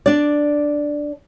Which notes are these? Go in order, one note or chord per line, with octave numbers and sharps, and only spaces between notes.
D4 D5